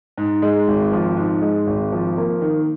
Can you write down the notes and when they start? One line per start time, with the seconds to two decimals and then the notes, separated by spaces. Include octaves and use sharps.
0.17 G#2
0.42 G#3
0.68 G#1
0.92 F3
1.17 G#2
1.42 G#3
1.67 G#1
1.92 F3
2.17 A#3
2.41 D#3